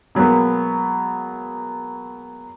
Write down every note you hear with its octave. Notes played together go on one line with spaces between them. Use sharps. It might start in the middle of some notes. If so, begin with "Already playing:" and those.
B2 F#3 G#3 A#3 B3